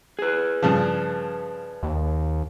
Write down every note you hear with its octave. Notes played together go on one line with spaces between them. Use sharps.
G#4 B4
G2 C#3 F3
D#2